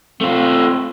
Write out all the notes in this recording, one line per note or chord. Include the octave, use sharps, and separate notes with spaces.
A3 C4 F4